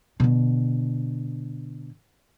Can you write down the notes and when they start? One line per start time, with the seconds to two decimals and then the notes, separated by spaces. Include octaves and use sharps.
0.20 B2 D3